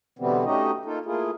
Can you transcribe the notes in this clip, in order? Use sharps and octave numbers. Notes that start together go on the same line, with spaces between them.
B2 D3 E3 G3 B3 C4
A3 C#4 D#4 F#4 G4 D#5
A3 A#3 D#4 F4 A4
A3 A#3 E4 F4 G#4